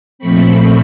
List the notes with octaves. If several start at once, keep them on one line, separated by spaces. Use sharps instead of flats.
A#2 F3 A3 C4 B5 C#6